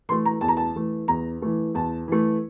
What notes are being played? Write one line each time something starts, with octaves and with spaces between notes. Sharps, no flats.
E3 A3 C6
A#5
E2 A5
A#5
A5
E3 A3
E2 A#5
E3 A3
E2 A5
E3 A3